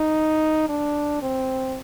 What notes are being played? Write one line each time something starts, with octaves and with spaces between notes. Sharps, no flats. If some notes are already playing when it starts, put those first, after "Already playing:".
Already playing: D#4
D4
C4